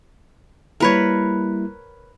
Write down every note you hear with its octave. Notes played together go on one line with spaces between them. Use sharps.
G3 A#3 E4 A#4 B4 C#5